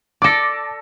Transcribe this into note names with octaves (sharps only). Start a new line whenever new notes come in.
A4 D5 D6 A#6